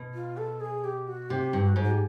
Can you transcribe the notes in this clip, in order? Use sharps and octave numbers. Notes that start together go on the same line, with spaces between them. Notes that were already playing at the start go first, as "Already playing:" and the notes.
Already playing: B2
F4
A4
G#4
G4
F#4
C3 G4
G2
F#4
G#2
F#4
G4